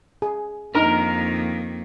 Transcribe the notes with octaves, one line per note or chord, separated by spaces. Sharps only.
G#4
F2 D#3 A#3 D4 D#4 A#4 A#5